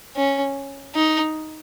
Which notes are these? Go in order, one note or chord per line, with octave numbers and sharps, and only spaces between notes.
C#4
D#4